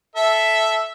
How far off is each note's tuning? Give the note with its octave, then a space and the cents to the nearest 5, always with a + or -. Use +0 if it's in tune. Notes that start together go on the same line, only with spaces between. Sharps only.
A4 -10 E5 +0